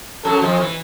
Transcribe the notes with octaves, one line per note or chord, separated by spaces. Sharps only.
F#2 F#3 A4
F2 F3
E3